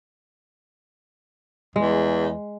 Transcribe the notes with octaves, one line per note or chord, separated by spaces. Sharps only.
E2 G#3